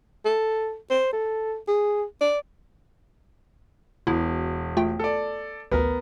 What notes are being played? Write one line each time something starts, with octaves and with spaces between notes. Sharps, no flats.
A4
C5
A4
G#4
D5
E1 B2 E4
A3 F4 G5
A4 D5
A1 D2 B3 A#4